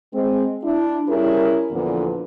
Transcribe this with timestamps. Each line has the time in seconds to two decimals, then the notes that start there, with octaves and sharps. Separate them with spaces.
0.13 G#3 C4
0.63 D4 E4
1.08 G3 C#4 E4 G#4 A#4
1.70 E2 A#2 D3 E3 F3 B3